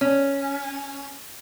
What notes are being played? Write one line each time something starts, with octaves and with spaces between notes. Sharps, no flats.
C#4